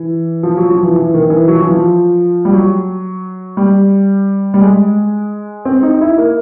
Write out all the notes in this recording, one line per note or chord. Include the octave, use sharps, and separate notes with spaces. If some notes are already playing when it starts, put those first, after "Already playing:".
Already playing: E3
F3
F#3
F3
E3
E3
D#3
E3
F#3
F3
E3
F3
G3
F#3
G3
G3
G#3
C4
D#4
E4
A#3